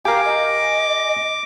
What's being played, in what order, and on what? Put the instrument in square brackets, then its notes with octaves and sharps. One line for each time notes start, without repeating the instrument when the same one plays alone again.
[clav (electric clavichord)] G4 A#4 [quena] F5 [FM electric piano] G#5 [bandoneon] D6
[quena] D#5